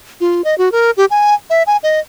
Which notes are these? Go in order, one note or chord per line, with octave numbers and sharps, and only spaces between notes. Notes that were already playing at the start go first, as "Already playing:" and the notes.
F4
D#5
F#4
A#4
G4
G#5
E5
G#5
D#5